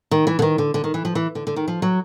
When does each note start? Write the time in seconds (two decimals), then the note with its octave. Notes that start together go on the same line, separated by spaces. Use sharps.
0.11 D#3
0.27 E3
0.39 D3
0.42 D#3
0.58 D3
0.74 D3
0.84 D#3
0.94 E3
1.05 F3
1.15 E3
1.35 D3
1.47 D3
1.56 D#3
1.68 F3
1.82 F#3